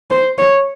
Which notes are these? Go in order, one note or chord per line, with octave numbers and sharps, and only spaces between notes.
C5
C#5